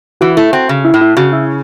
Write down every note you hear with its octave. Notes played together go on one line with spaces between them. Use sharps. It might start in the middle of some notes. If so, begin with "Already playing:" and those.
E3 F#4
A3 E4
C4 F#4
C#3
E4
A2
E4
C#3 F#4
E4